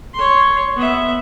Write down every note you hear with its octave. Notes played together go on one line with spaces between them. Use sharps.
C#5 C6
B3 E5